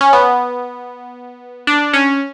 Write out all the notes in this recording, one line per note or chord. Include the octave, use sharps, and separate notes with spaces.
C#4
B3
D4
C#4